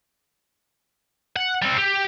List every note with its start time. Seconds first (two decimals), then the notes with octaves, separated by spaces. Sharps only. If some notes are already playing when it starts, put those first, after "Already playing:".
1.36 F#5
1.62 G3 C4
1.78 G4